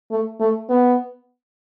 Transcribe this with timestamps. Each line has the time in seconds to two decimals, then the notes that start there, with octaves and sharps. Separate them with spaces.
0.11 A3
0.40 A3
0.69 B3